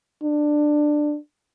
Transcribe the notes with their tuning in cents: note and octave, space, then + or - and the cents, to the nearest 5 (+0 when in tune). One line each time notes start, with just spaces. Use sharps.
D4 +15